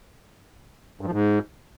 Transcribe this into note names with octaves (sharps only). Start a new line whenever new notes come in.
G2
F3
G#2